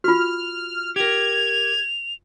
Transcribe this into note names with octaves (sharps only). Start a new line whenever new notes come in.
F4 F#4 F6
G4 A#4 G#6 F7